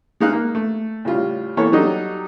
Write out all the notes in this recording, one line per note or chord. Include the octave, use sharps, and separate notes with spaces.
G#3 D#4 F5 F#6
A#3
A3
A2 C#3 G3 F4
E3 A#3 B3 A4 C#5
F#3 G3 D#4 G4 A4 D#5